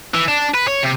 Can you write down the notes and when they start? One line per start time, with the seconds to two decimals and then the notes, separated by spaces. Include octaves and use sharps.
0.14 E3
0.28 D4
0.55 B4
0.68 C#5
0.83 C3